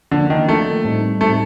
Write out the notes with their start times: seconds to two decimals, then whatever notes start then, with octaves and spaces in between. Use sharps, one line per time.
0.11 D3 F3 A#3 D4
0.30 D#3
0.48 F3 A3 A#3 D4
0.85 A2 G3 C4 D#4
1.21 A2 G3 A3 C4 D#4